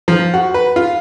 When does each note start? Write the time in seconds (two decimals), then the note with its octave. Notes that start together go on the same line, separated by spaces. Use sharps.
0.08 F3
0.34 F#4
0.54 B4
0.76 F4